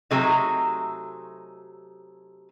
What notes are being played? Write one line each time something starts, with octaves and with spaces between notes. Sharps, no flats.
C3 F#3 A3 D#4 G#4